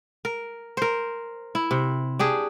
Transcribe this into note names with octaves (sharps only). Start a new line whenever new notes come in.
A#4
A#4 C5
E4
C3
D4 G4 G#4